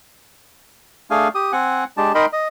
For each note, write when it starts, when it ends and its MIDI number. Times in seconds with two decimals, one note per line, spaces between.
1.11 1.28 57
1.11 1.28 62
1.11 1.28 68
1.11 1.28 77
1.11 1.28 80
1.35 1.52 67
1.35 1.52 87
1.52 1.84 60
1.52 1.84 78
1.52 1.84 80
1.97 2.13 56
1.97 2.13 62
1.97 2.13 67
1.97 2.13 81
2.15 2.26 63
2.15 2.26 70
2.15 2.26 75
2.15 2.26 79
2.15 2.26 83
2.15 2.26 84
2.33 2.48 75